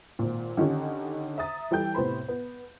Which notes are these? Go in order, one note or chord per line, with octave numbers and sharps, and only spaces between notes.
G#1 A#2
D3 D#3 C#4 G4
E5 A#5 D#6 A6
E3 G3 A4 G5 G6
A2 C3 B3 C5 B5
B3